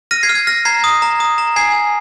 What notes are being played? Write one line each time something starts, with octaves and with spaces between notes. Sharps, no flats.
F6 A#6 D#7
G#6 C7
F6
G#6
F6 A#6
A#5 G#6 C7
D#6
A#5
D#6
A#5
G#5 G#6 C7
G#5